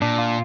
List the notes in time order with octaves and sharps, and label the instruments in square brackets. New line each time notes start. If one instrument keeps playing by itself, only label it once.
[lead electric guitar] A#2 [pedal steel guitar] D4
[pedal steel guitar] F4